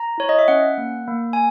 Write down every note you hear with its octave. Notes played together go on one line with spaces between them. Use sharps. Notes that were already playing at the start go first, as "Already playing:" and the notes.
Already playing: A#5
E4 C#5
D#5
E5
C#4 F#5
A#3
A#3
G#5